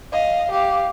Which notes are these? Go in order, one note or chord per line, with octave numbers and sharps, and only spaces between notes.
D#5 F5
G4 F5